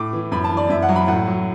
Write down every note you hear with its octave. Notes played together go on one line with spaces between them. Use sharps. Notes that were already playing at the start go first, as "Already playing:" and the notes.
Already playing: A2 D6
E3
F#2 B5
A5
E3
D5
F#2 E5
F#5
F#3
B5
A2 F#5
F#3